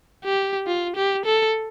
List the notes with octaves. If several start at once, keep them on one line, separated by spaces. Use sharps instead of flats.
G4
F4
G4
A4